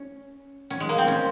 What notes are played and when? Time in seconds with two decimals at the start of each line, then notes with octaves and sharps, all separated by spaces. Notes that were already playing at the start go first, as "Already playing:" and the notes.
Already playing: C#4
0.70 C#4
0.80 G#3
0.89 A#3
0.98 C4
1.08 C#4